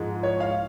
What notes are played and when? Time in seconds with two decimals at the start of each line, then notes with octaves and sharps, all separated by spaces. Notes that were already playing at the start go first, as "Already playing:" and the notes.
Already playing: G#2 F3 G#3
0.23 C#5
0.40 F5